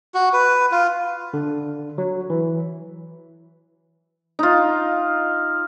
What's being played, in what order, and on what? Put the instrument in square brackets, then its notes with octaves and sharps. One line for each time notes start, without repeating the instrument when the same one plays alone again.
[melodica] F#4
B4
F4
[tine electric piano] D3
F#3
E3
[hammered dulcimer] D#4 F4